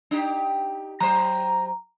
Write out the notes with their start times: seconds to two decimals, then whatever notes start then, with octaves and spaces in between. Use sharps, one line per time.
0.11 D4 D#4 G4
1.00 F#3 C5 A#5